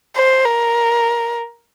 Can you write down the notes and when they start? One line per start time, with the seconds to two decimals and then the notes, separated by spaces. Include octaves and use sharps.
0.16 C5
0.45 A#4